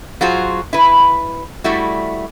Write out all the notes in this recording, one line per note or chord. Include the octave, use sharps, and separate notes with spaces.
F#3 F4 F#4 G#4 C5
E4 B4
G3 A3 E4 F#4